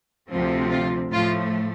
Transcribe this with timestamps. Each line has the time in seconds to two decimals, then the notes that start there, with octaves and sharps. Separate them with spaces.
0.30 D2 C3 F3 C4
0.70 F4
1.11 A2 F3 A3 F4